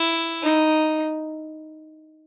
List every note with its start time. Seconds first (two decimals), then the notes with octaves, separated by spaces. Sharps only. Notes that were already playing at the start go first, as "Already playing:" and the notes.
Already playing: E4
0.43 D#4